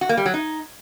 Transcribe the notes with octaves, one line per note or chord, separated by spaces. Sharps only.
F#4
A#3
G3
F#3
D#4